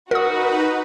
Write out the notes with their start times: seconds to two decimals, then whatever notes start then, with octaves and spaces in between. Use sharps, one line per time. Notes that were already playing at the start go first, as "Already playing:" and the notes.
0.11 D#4 F#4 A#4 B4 D#6